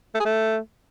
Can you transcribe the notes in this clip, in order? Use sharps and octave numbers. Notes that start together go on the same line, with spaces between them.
A3
G#4
A3